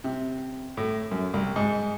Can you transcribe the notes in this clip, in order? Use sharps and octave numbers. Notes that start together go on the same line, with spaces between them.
C3
A2
F#2
C2
G#2